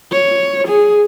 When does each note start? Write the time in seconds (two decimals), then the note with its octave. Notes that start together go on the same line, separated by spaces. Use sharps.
0.12 C#5
0.68 G#4